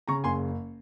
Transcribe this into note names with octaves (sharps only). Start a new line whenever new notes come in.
C#3 A#5 C#6
F#1 G#5 C6